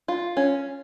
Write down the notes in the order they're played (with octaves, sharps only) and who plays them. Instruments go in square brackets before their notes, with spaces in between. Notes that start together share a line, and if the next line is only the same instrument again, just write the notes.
[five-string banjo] F4
C#4